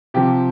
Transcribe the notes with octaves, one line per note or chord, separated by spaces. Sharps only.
C3 F3 G4